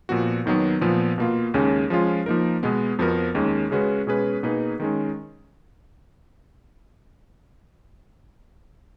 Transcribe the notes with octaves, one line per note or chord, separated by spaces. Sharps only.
A#2 F3 B3 F#4
D#2 D#3 F#3 B3
A#2 F3 B3
B2 A#3 F4
D#2 C#3 G#3 C#4
F3 G#3 C#4 F4
F3 A#3 D#4 A#4
B2 G#3 B3
F2 F3 B3 F#4 A#4
D#2 D#3 G#3 C#4
C#3 G#3 C#4 F#4 B4
B2 G#3 C#4 G#4 B4
B2 A#3 D#4 G#4 B4
D#3 G#3 C#4